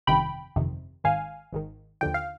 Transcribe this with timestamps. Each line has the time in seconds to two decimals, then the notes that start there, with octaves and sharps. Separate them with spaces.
0.07 G1 F2 C3 D#3 G5 B5
0.56 G1 F2 C3 D#3
1.04 G#1 G#2 D#3 F5 G#5
1.53 G#1 G#2 D#3
2.01 D#2 D3 F3 G5
2.14 F5